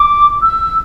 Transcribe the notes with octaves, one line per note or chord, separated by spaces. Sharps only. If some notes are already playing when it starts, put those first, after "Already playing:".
Already playing: D6
E6